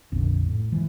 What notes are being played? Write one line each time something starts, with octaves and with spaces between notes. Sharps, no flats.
A#1 F2 D3
A2
E3 G#3